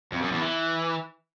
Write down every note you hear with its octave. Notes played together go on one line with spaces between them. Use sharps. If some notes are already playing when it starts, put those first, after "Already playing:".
F2
F#2
E2
E3